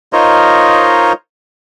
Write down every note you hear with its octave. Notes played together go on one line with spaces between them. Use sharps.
D#4 F4 A#4 C5 C#5 D#5